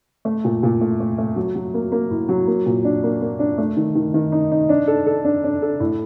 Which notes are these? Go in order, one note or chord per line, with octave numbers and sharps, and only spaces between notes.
A3
A#2
A#2
A3
A3
A3
F#3
F#3
A#3
A#3
A2
F#3
A#3
A#2
D4
A#3
A#3
D4
A3
D#3
D#3
D#3
D#4
D#4
D4
A4
A4
D4
D4
A4
A2